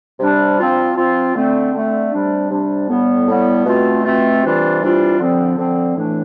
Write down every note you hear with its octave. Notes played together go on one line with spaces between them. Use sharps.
C3 G3 D4
F3 C4 F4
F3 C4 F4
D3 A3 C4
D3 A3 C4
C3 G3 D4
C3 G3 D4
A2 G3 B3
A2 G3 B3
B2 A3 C4 F4
B2 A3 C4 F4
C3 E3 G3 D4 F4
C3 E3 G3 D4 F4
D3 F3 C4
D3 F3 C4
A2 E3 A3 D4